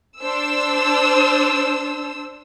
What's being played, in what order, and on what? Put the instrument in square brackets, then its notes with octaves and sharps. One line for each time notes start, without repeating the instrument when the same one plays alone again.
[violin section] D4 C5 E6